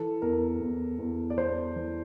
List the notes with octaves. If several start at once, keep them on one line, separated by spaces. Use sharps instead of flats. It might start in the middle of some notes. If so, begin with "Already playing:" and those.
Already playing: E3 A4
E2 A#4
E2
E2
D5
E2 C5
E3